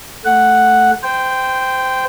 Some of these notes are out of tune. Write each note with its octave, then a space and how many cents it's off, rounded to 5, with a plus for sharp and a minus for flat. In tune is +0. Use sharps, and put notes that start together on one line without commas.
A3 +0 F#5 +0
C5 -20 G5 +0